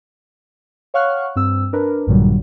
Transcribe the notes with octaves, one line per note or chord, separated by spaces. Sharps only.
C#5 F5 F#5 C#6 F6 F#6
G2 C4 E6
D4 A#4 B4
A#1 G2 A#2 D3 F#3 G3